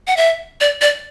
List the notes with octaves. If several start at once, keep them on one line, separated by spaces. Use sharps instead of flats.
F#5
E5
D5
D5